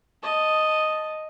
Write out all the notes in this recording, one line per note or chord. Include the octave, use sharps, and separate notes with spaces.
D#5 A5